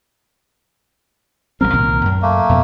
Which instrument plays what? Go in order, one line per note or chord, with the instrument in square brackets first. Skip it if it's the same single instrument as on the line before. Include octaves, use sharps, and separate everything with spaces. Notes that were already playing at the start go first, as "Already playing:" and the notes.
[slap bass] A1 G3 C4 [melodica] A#4
[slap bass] C2 A#2 D#3
F#2
[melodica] A3 A#3
[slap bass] F2 B2 B3